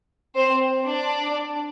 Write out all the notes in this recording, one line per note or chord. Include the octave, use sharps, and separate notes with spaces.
C4 C5
D4 D5